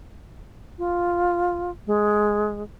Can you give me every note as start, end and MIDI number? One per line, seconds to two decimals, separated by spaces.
0.78 1.71 65
1.87 2.62 56